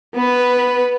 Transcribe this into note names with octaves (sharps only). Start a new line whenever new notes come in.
B3 B4